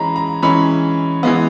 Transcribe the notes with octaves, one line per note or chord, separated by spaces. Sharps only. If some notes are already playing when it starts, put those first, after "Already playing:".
Already playing: E3 G#3 C#4 A#5 B5
A#5
E3 G#3 C#4 B5
E3 G#3 B3